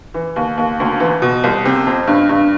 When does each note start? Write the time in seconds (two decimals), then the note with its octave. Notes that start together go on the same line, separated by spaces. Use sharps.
0.14 E3
0.36 D#2
0.58 D#2
0.80 D2
1.00 E3
1.22 B2
1.44 C2
1.66 C3
1.87 F2
2.08 G2
2.29 G2